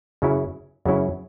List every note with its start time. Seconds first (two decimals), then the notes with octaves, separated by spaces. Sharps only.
0.22 F#2 C#3 F#3 C#4 E4
0.85 F#2 C#3 F#3 C#4 E4